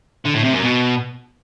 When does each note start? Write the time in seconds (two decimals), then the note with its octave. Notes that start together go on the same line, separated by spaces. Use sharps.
0.25 D3
0.34 A2
0.44 C3
0.53 F#2
0.62 B2